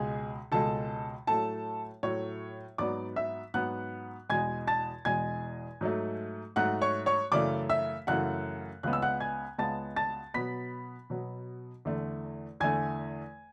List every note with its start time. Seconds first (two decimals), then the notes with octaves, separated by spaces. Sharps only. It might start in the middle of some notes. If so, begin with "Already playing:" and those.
Already playing: C#2 B2 G#3 G#4 G#5
0.52 C#2 B2 G#3 A4 A5
1.27 A2 F#3 A3 A4 A5
2.03 A2 F#3 A3 C#5 C#6
2.78 G#2 F#3 B3 D5 D6
3.16 E5 E6
3.54 G#2 F#3 B3 F#5 F#6
4.29 E2 B2 G#3 G#5 G#6
4.67 A5 A6
5.05 E2 B2 G#3 G#5 G#6
5.81 G#2 F#3 A3
6.56 G#2 F#3 A3 F#5 F#6
6.81 C#5 C#6
7.06 C#5 C#6
7.32 F#2 C#3 E3 A3 D5 D6
7.70 E5 E6
8.07 F#2 C#3 E3 A3 F#5 F#6
8.83 C#2 C#3 G#3 B3 F#6
8.93 E6
9.02 F#5 F#6
9.20 G#5 G#6
9.58 C#2 C#3 G#3 B3 A5 A6
9.96 A5 A6
10.34 B2 F#3 B3 B5 B6
11.10 B2 F#3 B3
11.85 E2 D3 A3
12.60 E2 D3 A3 G#5 G#6